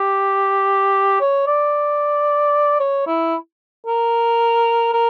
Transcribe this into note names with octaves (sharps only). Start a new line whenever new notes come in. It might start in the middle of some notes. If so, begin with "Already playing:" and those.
Already playing: G4
C#5
D5
C#5
E4
A#4
A#4